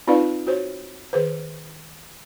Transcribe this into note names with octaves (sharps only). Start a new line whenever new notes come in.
C4 D#4 F4 B4 D5 F5
F#4 C5 C#5
D#3 G#4 B4 C5